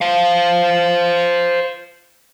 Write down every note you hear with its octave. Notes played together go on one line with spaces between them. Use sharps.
C5 F5